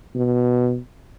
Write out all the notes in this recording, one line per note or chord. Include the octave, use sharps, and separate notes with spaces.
B2